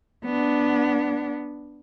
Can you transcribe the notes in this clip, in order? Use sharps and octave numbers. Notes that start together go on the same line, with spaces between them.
B3 D4